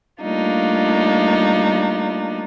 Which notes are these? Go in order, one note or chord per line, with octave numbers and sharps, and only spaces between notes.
G3 A3 A#3 D4 D#4 F4